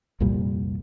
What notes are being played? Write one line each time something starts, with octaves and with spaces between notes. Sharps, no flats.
C2 F2 A#2 G3